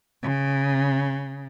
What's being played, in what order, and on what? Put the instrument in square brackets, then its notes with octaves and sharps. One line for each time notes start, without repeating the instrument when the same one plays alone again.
[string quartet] C#3